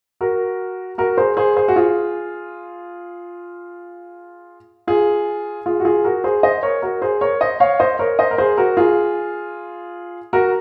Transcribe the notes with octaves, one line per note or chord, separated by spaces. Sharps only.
F#4 A#4
F#4 A#4
G#4 C5
G#4 C5
G#4 C5
F#4
F4 G#4
F4 G#4
F4 G#4
F#4
F4 G#4
F#4 A#4
G#4 C5
C5 D#5
A#4 C#5
F#4 A#4
G#4 C5
A#4 C#5
C5 D#5
C#5 F5
C5 D#5
A#4 C#5
C5 D#5
A#4
G#4 C5
F#4 A#4
F4 G#4
F#4 A#4